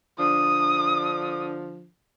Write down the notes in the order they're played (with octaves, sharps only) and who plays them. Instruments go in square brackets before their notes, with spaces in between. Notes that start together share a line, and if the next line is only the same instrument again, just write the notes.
[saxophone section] D3 F3 D4 [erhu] D#6